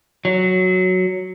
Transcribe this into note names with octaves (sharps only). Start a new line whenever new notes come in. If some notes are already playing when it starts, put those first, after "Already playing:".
F#3